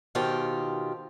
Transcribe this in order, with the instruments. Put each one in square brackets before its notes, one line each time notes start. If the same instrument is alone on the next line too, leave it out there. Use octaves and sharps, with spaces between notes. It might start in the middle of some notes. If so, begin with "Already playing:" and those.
[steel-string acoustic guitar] B2 D#3 F4 G4 C5